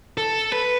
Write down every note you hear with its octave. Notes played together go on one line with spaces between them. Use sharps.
A4
B4